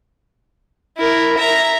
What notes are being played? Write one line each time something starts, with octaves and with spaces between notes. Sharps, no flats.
E4 A#4
E5 A#5